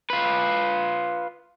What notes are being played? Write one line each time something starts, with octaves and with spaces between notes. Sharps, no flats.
F4 B4